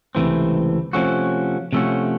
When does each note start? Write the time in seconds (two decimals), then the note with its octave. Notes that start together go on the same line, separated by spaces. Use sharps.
0.15 C#2 C3 E3 A3 C4
0.93 C3 F3 A3 C#4 F#4
1.73 C3 F3 A3 C#4 F#4